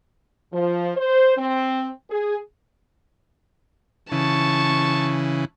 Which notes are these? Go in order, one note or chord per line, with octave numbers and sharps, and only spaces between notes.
F3
C5
C4
G#4
C#3 E3 A5 C#6